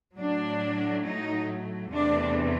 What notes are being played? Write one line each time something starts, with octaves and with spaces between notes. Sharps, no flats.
A2 F#3 A3 D4
D#4
E2 C3 E3 A3 D4